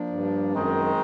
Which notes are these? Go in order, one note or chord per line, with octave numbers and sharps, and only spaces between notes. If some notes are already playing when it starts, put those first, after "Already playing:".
Already playing: F3 A#3 D4
G2
F#2 D#3 G#3 C4 D#4